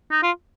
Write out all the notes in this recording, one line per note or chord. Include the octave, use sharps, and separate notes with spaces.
D#4
F4